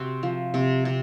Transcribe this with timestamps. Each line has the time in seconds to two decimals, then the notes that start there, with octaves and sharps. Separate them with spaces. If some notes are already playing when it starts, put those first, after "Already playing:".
Already playing: C3 C4 F#4
0.23 F3
0.54 C3
0.85 C3